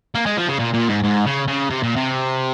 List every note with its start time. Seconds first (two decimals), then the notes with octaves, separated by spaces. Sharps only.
0.15 A#3
0.26 G#3
0.37 F3
0.49 C#3
0.60 A#2
0.74 A#2
0.89 G#2
1.04 G#2
1.26 C#3
1.48 C#3
1.70 C3
1.83 A#2
1.96 C3